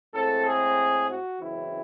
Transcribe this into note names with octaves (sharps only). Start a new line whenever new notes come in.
A2 G#3 C4 A4
G#4
F#4
F#2 C#3 E3 G#3 C4 E4